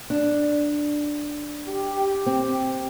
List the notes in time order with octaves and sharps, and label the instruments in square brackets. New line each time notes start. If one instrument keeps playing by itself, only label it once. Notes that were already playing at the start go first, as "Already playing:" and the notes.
[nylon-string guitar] D4
[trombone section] G4
[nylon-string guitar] C4